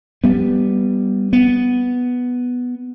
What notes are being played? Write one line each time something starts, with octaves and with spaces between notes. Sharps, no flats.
G3 B3
B3